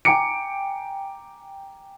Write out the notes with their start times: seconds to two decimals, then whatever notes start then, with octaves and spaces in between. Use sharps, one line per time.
0.05 G5 G#5 A#5 D6 C#7 D7